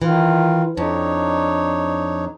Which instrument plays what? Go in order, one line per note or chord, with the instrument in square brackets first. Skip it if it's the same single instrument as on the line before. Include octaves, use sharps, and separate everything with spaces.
[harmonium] D#3 F4 [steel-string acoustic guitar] E3
[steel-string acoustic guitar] F2 [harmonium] D4 D#4 C#5